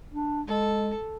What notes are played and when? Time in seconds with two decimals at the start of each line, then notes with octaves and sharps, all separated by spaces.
0.12 D4
0.47 G#3 A4